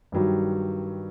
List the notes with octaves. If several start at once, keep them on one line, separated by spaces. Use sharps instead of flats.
G2 D#3 F#3 G3